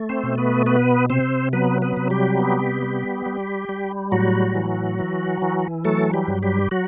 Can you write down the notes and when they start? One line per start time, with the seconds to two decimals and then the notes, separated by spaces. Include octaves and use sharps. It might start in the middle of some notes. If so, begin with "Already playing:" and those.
Already playing: A3
0.09 C4 C5
0.23 B2
0.38 B3 B4
0.66 B3 B4
1.10 C3 C4 C5
1.53 F#3 B3 B4
1.82 B3 B4
1.97 C3
2.10 G3 G4
2.39 B3
2.83 G3
3.26 G3
3.69 G3
4.12 A2 F#3 F#4
4.55 E3
4.99 E3
5.42 E3
5.85 F#3 A3 A4
6.13 G3 G4
6.28 G2
6.43 G3 G4
6.71 F#3 F#4